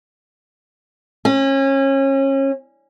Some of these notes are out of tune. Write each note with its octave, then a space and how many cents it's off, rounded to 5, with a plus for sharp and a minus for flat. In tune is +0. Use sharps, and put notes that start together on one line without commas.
C#4 -30